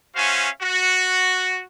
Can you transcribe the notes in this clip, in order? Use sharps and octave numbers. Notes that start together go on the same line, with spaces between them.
C#4 F#4 C5 E5 F5 G#5
F#4